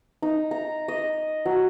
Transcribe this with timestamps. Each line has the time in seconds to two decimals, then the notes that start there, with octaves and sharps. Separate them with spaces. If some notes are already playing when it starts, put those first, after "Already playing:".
0.22 D#4
0.51 A#5
0.88 D#5
1.45 F#3